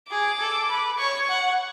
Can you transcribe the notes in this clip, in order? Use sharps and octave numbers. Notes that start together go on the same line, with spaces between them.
G#4 D6
A4
B4
C#5 C#6
F#5